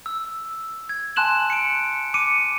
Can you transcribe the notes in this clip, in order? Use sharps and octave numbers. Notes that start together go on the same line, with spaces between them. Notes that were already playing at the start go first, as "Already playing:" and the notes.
E6
G#6
G#5 A5 C6 F#6 E7 F#7
C#7 D7
D6 C#7 D#7